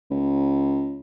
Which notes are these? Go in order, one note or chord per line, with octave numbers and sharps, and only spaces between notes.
C#2